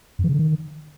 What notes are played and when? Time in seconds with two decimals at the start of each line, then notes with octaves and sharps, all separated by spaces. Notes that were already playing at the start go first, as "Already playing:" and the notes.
0.19 F#2
0.24 E3
0.29 C#3
0.34 D3
0.39 D#3